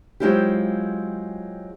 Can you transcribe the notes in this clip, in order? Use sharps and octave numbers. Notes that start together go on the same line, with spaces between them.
F#3 G#3 C4 E4 F4 G4